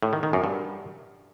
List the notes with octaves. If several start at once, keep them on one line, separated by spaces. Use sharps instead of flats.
A2
D#3
D#3
F#2
G2